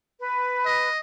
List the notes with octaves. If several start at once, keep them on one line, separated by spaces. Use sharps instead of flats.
B4
D#5